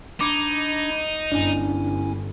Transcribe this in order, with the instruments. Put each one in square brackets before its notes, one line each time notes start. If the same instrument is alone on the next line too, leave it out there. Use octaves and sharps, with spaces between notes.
[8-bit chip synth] D4 B5 G#6 [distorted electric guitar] D#4 [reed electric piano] D6
[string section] G1 [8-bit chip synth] C#4 E4 G#5 [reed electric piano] D4